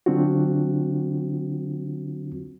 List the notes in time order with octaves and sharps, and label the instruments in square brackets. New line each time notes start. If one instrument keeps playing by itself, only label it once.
[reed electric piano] D3 F#3 C4 D4 F4 F#4